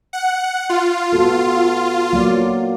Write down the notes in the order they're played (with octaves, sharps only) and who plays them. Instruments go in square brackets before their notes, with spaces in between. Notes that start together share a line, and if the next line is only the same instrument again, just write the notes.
[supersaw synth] F#5
F4
[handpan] B3 F#4 A4
F#3 A#3 D5